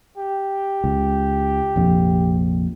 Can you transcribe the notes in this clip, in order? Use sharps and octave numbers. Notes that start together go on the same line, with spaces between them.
G4
C#2
A#1 F2 C3